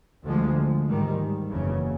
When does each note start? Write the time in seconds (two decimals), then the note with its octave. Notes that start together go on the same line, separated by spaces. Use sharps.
0.24 D2 D3 F3 G#3
0.86 G#2 D#3 G3
1.49 F#1 E2 C#3